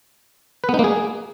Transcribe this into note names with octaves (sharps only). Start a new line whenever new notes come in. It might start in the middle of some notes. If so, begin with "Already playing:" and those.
B4
B3
D#4
A#3
G#4